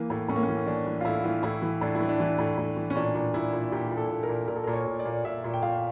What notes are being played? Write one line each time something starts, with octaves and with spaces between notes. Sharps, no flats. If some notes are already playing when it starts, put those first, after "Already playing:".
Already playing: E3 A#3
A2
A2 C#4
A#3
C#4
E3
E3 D4
E3
F4
A2 E4
E3 F4
A2 E4
E3
A2 D4
E4
E3
D4
E3
A2
A2
E3
C#4
A#2 D4
A#2
A#2 E4
A#2
A#2 G4
A#2
A4
A#2
A#4
A#2
A#2 A#4
A4
A#2 A#4
C#5
A#2
D5
A#2
A#2 E5
A#2
G5
A#2 F5